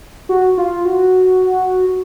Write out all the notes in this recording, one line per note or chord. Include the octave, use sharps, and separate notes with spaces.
F#4
F4
F#4